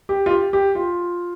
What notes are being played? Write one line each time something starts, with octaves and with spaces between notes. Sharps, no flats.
G4
F4
G4
G4
F4